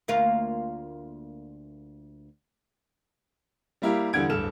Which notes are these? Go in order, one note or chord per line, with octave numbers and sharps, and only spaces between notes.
D2 A#3 F4
G3 A#3 E4 G4 A#4 F5
E2 D3 G3 F#5 G#6 D7
D1 G2 A4 F6 E7